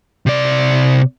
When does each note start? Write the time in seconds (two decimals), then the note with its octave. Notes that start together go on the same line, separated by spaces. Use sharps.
0.26 C3 D5